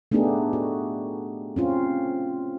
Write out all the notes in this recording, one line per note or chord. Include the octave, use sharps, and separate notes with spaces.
A3 B3 D4 D#4 G4 G#4
F#4
C4 C#4 F4